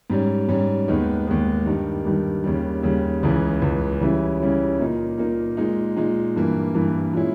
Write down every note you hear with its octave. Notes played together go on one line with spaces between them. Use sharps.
G#2 G3 C#4
G#2 G3 C#4
D#2 D#3 G#3 B3
D#2 D#3 G#3 B3
G2 D#3 G3
G2 D#3 G3
D#2 C#3 G3
D#2 C#3 G3
C#2 C#3 E3
C#2 C#3 E3
C#3 E3 G3 C#4 E4
C#3 E3 G3 C#4 E4
A#2 A#3 D#4
A#2 A#3 D#4
A#2 G#3 D#4
A#2 G#3 D#4
G2 E3 A#3
G2 E3 A#3
A#2 G#3 C#4 E4